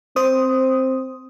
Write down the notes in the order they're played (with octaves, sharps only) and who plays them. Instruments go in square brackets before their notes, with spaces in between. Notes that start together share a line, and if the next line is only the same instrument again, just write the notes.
[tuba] C4 [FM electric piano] C5 D#6